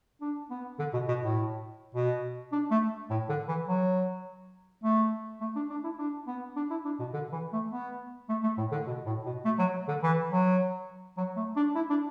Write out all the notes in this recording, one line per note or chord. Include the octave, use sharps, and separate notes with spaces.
D4
B3
D3
B2
B2
A2
B2
D4
A3
A2
D3
E3
F#3
A3
A3
D4
D4
E4
D4
B3
D4
E4
D4
B2
D3
E3
A3
B3
A3
A3
A2
D3
B2
A2
B2
A3
F#3
D3
E3
F#3
F#3
A3
D4
E4
D4